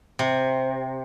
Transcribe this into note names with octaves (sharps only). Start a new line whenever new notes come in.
C3